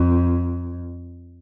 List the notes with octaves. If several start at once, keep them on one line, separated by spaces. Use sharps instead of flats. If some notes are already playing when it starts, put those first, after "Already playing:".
Already playing: F2